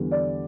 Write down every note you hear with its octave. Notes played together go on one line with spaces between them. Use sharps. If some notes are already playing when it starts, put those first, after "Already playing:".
Already playing: E2 D3 G3
D5